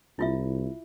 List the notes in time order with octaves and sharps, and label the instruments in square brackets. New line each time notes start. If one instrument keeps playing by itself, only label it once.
[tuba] C2 [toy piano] E4 F4 E5